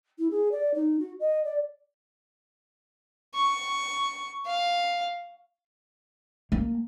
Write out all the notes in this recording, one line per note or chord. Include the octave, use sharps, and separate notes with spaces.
E4
G#4
D5
D#4
F#4
D#5
D5
C#6
F5
A#3